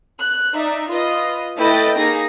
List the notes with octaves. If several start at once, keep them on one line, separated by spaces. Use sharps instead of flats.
F#6
D#4 D5 E5
F4 B4 D#5
A3 E4 B4 D#5 G5 A6
A#3 D#4 G#4 A#6